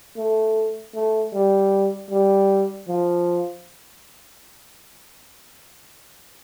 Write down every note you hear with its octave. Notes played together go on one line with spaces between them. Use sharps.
A3
A3
G3
G3
F3